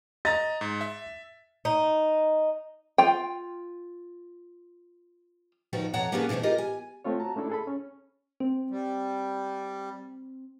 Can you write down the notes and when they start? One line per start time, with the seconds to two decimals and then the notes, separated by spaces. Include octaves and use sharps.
0.25 D#5 A#5 A6
0.61 G#2
0.81 E5
1.65 D#4
2.98 F4 G5
5.73 D#3 F3 G3 B3 F4 F#4
5.93 F2 B2 C#5 F#5 A5 A#5
6.12 A#3 B3 C#4 D4 G4 G#4
6.29 B2 E3 G#3 A3 C4
6.43 F4 G4 G#4 A#4 D#5
6.58 G#5
7.05 A3 C4 F4 C#5
7.20 F#4 A5 A#5
7.36 A3 C#4 D4 E4 A4
7.50 G#4 A4 B5
7.67 C#4
8.40 C4
8.70 G3